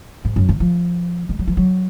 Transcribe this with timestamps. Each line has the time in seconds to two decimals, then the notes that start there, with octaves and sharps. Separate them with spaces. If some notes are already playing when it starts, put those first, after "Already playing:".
0.25 G#2
0.36 F#2
0.49 D#3
0.60 F3
1.29 G#3
1.39 F#3
1.48 F3
1.57 F#3